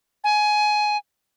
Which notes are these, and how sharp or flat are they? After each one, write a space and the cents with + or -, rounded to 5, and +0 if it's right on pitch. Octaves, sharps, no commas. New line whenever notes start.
G#5 +15